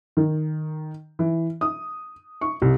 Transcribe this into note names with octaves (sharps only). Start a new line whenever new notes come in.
D#3
E3
D#6
C#6
C2